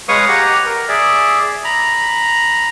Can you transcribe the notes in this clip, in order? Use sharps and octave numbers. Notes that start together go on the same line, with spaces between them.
G#3 B4 C#5 F5 C#6 D#6
G4 F#5 A#5
A#4
G#4 D5 E5
A#5 B5